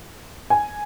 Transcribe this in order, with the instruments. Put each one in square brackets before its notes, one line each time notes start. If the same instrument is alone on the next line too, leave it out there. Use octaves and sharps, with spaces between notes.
[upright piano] G#5